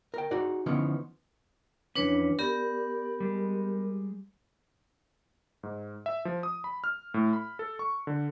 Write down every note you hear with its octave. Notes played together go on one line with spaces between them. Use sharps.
A#4 G5
D#4 F#4 G#4 D5
D3 E3 F3 B3 C#4 D#4
F2 E3 C#4 D4 B4 C#5
B3 G4 A#4 D5
G3 G#3
G#2
E5
F3
D#6
B5
F6
A2
B5
A4
C#6
D3